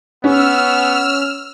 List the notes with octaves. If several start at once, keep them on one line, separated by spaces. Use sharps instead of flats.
B3 C#4 E6 F6